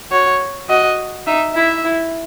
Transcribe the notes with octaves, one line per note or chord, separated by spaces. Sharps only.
F#4 C#5
F#4 D#5
D#4 E5
E4 E5
E4